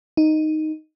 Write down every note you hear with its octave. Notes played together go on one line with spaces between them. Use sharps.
D#4